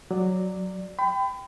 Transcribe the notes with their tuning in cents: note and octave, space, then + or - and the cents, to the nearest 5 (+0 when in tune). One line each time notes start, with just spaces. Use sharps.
F#3 +0 D5 +0
G5 +0 B5 +35